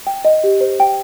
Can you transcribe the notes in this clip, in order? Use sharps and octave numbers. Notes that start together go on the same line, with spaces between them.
G5
D#5
G4
C5
G5